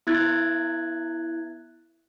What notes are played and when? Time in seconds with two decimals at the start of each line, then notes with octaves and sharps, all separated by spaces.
0.07 B3 E4 F#6 G#6 A6